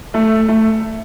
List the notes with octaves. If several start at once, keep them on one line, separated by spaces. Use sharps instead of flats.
A3
A3